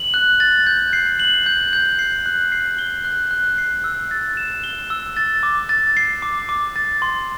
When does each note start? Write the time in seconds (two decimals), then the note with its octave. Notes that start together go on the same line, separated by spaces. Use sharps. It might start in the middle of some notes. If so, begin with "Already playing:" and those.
Already playing: F#7
0.14 F#6
0.40 A6
0.67 G6
0.93 C7
1.20 F#7
1.46 G6
1.73 G6
1.99 C7
2.26 F#6
2.52 C7
2.79 G7
3.05 F#6
3.31 F#6
3.58 C7
3.84 E6
4.11 A6
4.37 E7
4.64 G7
4.90 E6
5.17 A6
5.43 D6
5.69 A6
5.97 C7
6.22 D6
6.49 D6
6.76 A6
7.02 C6